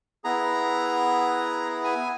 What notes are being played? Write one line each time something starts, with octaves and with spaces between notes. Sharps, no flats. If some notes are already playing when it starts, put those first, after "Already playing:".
B3 E4 G#4 A#5
G#5